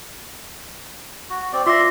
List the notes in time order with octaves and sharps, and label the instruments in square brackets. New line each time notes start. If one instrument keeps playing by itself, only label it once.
[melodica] F#4
C4 D5
[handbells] F4 A#6 [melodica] D5 E5 C6